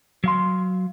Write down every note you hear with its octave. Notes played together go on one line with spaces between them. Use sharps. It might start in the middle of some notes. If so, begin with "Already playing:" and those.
F#3 F5 C6